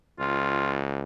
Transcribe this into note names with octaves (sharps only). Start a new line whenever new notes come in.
C#2 F4